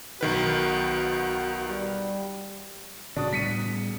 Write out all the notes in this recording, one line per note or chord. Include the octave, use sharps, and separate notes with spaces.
B1 D#3 F#4 B4
G3
G2 A#2 C#3 D4 F#4 D#6
A2 G3 B3 B6 C#7 D#7